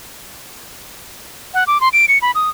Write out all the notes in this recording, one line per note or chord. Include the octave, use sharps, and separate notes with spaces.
F#5
D6
C6
D7
C#7
B5
D#6